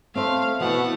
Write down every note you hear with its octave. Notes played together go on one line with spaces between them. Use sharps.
A3 C4 C5 F5
B2 E3 A3 B3 F#5